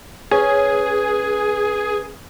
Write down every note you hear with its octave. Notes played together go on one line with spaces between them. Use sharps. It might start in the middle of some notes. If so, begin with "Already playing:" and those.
C#4 G#4 B4